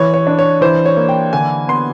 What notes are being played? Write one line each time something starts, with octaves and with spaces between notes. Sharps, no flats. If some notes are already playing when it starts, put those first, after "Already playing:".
Already playing: E3 C#5
C#5
D4
C#5
E3 C5
C#5
A#3
G5
D3 G#5
B3 C6